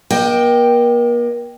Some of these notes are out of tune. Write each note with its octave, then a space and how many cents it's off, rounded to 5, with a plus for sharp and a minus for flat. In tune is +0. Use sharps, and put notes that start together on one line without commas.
A#3 +40 D#5 +0 G5 +0